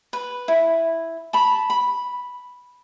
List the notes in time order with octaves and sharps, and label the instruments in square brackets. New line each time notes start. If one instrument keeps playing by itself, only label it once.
[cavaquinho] B4
E4
A5 B5
B5